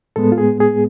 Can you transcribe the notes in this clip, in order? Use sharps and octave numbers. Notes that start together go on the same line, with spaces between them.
A2 G#3 B3 A4
F4
G#4
G#4